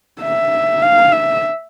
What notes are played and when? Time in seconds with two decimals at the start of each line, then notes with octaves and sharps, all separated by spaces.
0.22 E5
0.81 F5
1.12 E5